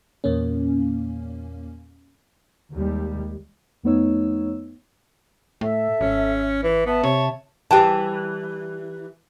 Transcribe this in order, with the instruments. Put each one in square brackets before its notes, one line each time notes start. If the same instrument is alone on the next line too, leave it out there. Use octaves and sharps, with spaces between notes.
[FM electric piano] E2 A#2 A#3 C#4
[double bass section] D#2 G3 G#3
[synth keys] F2 A3 B3 D#4 C#5 E6
[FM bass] A2 [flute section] A4 E5
[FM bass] G#1 [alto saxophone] C#4
[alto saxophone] E3
[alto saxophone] B3 [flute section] E5 A5
[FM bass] C3 [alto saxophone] C#5
[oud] E3 G3 [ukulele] G#4 G5 A5